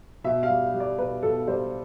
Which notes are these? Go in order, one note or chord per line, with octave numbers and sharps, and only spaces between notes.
B2 E5
F5
G3
G3
D5
B2 B4
B2 A4
G3 C5